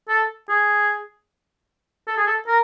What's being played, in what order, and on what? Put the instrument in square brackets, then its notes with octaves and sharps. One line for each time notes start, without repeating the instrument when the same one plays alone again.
[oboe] A4
G#4
A4
G#4
A4
A#4